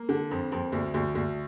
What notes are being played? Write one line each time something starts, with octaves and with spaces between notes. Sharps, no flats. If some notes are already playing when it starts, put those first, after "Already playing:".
Already playing: A#3
D3
F2
F2
D2
D2
D2